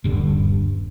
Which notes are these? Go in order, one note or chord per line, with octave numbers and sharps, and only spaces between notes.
D#1 G2 D3